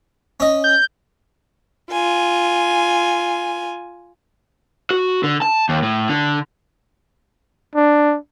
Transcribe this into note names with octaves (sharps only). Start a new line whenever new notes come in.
C#4 D#5
G6
F4 G#5
F#4
D3
A5
D#2
A2
D3
D4